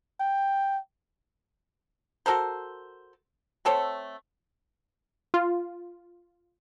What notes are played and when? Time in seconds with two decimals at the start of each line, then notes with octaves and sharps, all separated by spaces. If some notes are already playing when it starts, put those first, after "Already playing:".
0.20 G5
2.26 F#4 A4 A#4 C5
3.65 A3 C4 A4 C#5
5.34 F4